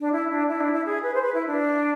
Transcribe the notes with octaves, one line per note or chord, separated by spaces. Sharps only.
D4
E4
D4
E4
D4
E4
G#4
B4
C5
B4
E4
D4